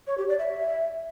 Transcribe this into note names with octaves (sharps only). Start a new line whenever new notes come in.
C#5
G4
D5
E5